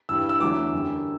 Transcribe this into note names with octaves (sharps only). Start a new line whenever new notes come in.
G2 E3 G3 E6
E6
E2 D3 F#3 A3 D6
F#2 D3 G3